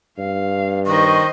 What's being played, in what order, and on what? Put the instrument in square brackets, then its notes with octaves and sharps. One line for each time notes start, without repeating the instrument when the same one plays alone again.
[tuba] G2 [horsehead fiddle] F5
[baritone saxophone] D#3 [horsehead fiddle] C5 D#5 [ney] C#6